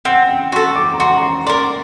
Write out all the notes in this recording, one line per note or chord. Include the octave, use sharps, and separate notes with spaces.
C4 F#5
G5
F#4 A4 C6
D6
A#5
F#4 C6
A#5
C6
A#4 D5 C6